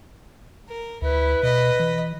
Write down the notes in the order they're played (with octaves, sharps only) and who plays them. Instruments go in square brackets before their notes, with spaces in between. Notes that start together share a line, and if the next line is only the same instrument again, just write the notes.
[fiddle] A#4
[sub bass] D2 [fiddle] E4 [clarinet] B4
[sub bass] B2 [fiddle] D#5 B5
[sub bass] E3